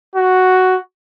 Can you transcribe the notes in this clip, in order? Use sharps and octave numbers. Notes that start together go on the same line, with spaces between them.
F#4